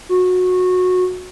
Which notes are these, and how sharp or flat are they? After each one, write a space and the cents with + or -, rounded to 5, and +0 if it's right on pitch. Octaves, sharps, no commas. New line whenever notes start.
F#4 -20